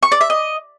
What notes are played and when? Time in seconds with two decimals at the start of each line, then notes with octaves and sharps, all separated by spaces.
0.03 C#6
0.12 D5
0.21 E5
0.30 D#5